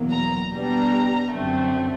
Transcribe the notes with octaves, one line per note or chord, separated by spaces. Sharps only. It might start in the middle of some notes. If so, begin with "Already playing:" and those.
Already playing: E2 B2 F#3 A#3
A#5
B2 G3 B3 D4 A#5
F#2 D3 F#3 A3 C4